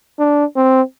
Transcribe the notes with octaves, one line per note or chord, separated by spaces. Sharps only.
D4
C4